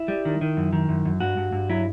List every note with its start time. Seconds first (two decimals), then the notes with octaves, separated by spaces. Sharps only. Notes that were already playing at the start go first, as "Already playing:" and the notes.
Already playing: E4
0.08 G3
0.25 D#3
0.41 D#3
0.57 F#2
0.73 D#3
0.89 F#2
1.05 F#2
1.20 G2 F#4
1.37 G2
1.52 G2
1.69 F#3 E4